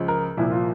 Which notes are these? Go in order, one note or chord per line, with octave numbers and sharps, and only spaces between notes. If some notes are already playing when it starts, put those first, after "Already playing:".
Already playing: C#2 C#3 F3
A#4
C2 A#2 F3 E4
F4